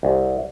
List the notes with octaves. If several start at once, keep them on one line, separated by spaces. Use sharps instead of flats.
C2